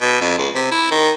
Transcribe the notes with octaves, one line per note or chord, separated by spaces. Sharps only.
B2
F2
C#2
C3
E4
D#3